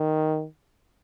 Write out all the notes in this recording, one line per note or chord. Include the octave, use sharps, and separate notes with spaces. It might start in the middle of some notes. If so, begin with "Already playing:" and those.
Already playing: D#3